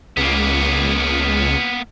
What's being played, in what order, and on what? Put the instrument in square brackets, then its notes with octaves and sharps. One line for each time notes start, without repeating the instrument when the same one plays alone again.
[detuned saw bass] C#2 [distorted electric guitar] A#3 B3